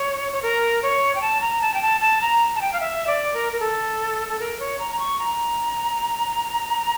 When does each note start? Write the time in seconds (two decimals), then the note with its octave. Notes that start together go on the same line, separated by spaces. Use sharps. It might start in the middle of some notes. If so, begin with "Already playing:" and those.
Already playing: C#5
0.33 C#5
0.43 A#4
0.83 C#5
1.15 G5
1.21 A5
1.41 A#5
1.62 A5
1.74 G5
1.82 A5
2.01 A5
2.21 A#5
2.56 A5
2.61 G5
2.73 F5
2.80 E5
3.07 D5
3.34 A#4
3.53 A#4
3.60 A4
4.29 A4
4.40 A#4
4.60 C#5
4.79 A#5
4.91 A#5
4.99 C#6
5.19 A#5